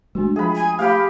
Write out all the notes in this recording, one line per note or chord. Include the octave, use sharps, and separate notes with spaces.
G#3 A3 D4 F#4
F3 F4 G#4 G5 B5
G#5
A3 G4 F5 B5